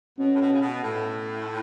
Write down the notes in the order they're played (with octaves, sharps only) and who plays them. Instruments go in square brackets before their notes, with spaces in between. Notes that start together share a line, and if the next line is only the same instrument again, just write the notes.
[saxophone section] B2 [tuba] C#4
[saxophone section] A2
B2
C#3
B2
A2